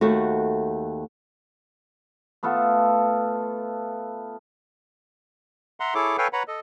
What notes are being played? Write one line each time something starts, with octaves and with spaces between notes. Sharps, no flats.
D#2 A3 F#4
A3 B3 F4 A4
E5 F#5 A#5 C6
E4 G#4 A4 C#5 D6
A4 B4 C#5 F5 G5 G#5
B4 C#5 F#5 A#5 B5
A4 D#5